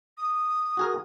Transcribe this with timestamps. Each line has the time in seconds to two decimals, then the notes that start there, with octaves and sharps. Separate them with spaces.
0.17 D#6
0.77 F#4 G#4 A#4